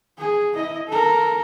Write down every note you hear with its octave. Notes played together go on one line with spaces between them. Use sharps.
G#4
E4 D#5
A4 A#4